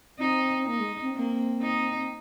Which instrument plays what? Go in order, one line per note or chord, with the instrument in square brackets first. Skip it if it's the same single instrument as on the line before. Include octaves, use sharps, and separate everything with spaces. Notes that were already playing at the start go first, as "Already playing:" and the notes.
[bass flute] C4 [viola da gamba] D#4
[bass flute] A#3 [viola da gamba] D#4
[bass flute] G#3
C4
[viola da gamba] A#3 [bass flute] C4
[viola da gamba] D#4